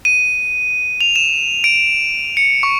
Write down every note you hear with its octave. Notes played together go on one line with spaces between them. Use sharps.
D#7
F7
E7
D7
C#7
C#6